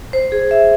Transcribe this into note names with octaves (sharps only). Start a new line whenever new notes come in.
C5
G#4
E5